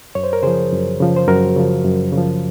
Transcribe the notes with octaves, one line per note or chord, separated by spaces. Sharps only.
F#2 C#5
C5
A#4
C#3 F3 G#4 C5
F#2
C#3 F3
C5
F#2 F#4 A#4
C#3 F3
F#2
C#3 F3